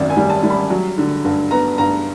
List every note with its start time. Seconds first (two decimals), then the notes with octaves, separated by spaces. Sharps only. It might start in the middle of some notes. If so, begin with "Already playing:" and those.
Already playing: G#1 F#2 D5 E5
0.10 G#5
0.17 G3
0.30 A5
0.43 G3
0.50 B5
0.70 F#3
0.98 D3
1.25 G2
1.51 B3 A#5
1.78 G2 A#5